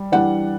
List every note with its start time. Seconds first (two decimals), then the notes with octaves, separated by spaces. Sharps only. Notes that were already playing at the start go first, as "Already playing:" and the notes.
Already playing: G3
0.12 E3 G3 D4 F#5